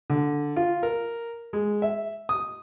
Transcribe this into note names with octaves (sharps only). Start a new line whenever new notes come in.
D3
F4
A#4
G#3
E5
D#6